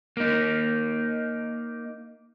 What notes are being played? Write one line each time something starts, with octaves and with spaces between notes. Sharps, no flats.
A#3 D#4